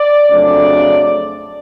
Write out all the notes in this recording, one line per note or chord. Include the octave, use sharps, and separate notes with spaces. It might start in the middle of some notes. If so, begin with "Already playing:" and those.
Already playing: D5
F2 C#3 F#3 A3 D4 D5